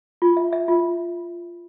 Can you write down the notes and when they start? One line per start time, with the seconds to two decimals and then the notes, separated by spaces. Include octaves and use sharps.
0.22 F4
0.37 E5
0.53 E5
0.68 F4